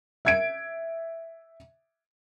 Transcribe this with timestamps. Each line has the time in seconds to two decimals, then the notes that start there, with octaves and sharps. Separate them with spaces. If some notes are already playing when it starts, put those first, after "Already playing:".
0.25 E5 G#6 D7